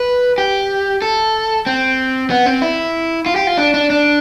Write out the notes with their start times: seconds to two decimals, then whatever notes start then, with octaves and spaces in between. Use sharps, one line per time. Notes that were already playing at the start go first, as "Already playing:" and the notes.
Already playing: B4
0.38 G4
1.02 A4
1.66 C4
2.30 B3
2.46 C4
2.62 E4
3.26 F4
3.36 G4
3.47 F4
3.57 D4
3.74 D4
3.90 D4